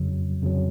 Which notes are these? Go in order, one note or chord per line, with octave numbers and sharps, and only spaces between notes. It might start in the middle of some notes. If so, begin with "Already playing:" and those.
Already playing: F2 C#3 F#3
F2 C#3 F#3